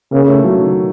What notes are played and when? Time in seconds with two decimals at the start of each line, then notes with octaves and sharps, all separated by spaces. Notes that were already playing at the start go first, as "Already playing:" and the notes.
0.12 C#3 A#3
0.28 A3
0.44 F#3
0.60 D#3